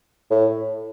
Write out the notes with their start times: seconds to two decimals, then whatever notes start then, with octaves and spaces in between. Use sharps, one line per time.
0.31 A2